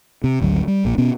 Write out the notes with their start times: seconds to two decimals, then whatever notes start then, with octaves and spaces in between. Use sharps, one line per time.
0.24 C3
0.40 G#1 D2 C#3 F#3
0.68 G3
0.85 A#1 A#2
0.98 B2 B3 C#4